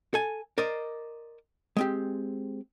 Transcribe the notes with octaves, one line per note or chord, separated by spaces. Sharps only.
A4 G#5
A#4 C5 D5 D#5
G#3 C4 G4